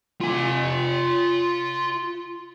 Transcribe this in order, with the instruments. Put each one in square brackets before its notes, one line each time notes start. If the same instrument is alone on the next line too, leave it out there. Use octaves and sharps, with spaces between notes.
[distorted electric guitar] F4 G#5